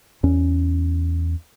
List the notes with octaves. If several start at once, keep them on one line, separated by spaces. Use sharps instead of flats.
E2 C#4